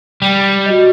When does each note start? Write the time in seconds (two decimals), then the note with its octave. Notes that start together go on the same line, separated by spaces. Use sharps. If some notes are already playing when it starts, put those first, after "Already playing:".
0.22 G3
0.66 F#4 D#5